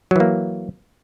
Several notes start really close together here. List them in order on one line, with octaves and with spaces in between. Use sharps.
F#3 E3 A#3